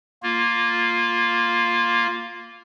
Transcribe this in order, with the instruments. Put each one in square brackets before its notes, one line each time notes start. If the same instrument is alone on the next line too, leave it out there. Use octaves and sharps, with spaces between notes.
[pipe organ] A#3 F4